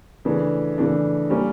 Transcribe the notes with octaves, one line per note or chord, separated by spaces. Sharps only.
C#3 E3 A3 D4
C#3 E3 A3 D4
G3 A#3 C#4